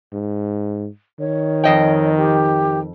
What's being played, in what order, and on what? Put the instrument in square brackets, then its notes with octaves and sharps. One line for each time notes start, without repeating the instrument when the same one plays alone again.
[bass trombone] G#2
[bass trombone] D#3 [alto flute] C#5
[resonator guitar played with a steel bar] F2 D#5 G5
[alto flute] G4